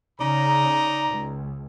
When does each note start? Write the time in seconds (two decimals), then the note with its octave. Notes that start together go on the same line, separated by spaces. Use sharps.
0.19 C#3 D#4 D5 A#5
1.09 C#2